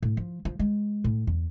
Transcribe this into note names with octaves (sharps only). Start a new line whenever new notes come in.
A2
F3
F3
G#3
A2
E2